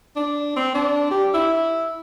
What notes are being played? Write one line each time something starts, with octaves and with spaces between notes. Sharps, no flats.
D4
C4
D4
G4
E4